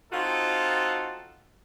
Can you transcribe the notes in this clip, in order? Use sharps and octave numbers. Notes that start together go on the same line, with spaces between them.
C4 D#4 F4 F#4 A4